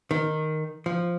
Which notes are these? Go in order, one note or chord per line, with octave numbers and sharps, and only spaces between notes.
D#3
F3